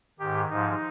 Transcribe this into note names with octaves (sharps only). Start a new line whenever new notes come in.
G#2 D#3 G4
G#2 F3 D#4